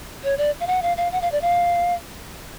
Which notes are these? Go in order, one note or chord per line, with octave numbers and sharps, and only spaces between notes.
C#5
D5
F5
F#5
F5
F5
F#5
F5
D5
F5